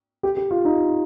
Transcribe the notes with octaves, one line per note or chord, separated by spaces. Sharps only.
G4
G4
F4
D#4